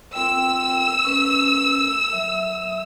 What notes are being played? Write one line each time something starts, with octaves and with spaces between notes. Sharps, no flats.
C4 F4 G5 E6
C#4 B4
F#3 E5